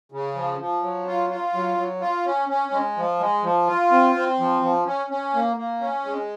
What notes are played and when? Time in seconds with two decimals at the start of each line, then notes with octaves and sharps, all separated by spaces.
0.12 C#3
0.35 F3
0.59 F3
0.82 F#3
1.07 F4
1.30 F4
1.54 F#3
1.77 F#3
2.01 F4
2.26 C#4
2.49 C#4
2.72 G#3
2.97 F3
3.20 G#3
3.44 F3
3.67 F4
3.91 C4
4.15 C4
4.39 F3
4.62 F3
4.86 C#4
5.10 C#4
5.34 A#3
5.57 A#3
5.81 C#4
6.05 G#3